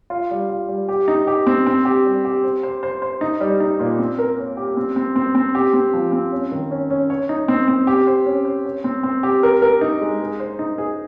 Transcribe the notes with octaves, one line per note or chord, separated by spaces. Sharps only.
F4
G3
F4
G3
G4
D#4
G4
C4
C4
G4
G3
G4
C5
C5
C5
C5
D#4
G3
D#4
A#2
C4
A#4
C#5
G4
C4
C4
C4
C4
G4
C4
F3
C4
C#4
D#3
C#4
C#4
C#5
D#4
C4
C4
G4
C5
C#4
C5
C#5
C4
C4
G4
A#4
A#4
D#4
G#3
G#4
C5
D#4
G#4